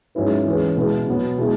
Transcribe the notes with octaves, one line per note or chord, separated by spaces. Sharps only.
G#2 F#3 C#4 E4 B4
E3 G#3 C#4 G#4 B4
B2 G#3 E4 B4
B2 F#3 B3
B2 G#3 E4